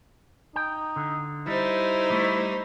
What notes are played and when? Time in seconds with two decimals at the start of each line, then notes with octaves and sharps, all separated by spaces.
0.56 D#4 G5
0.96 D3
1.47 G3 D#4 E4 C5
2.10 G3 A3